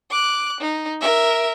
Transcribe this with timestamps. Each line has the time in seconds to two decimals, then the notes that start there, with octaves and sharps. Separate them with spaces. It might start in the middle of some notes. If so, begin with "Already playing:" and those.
0.10 D6 F#6
0.60 D#4
1.01 A#4 E5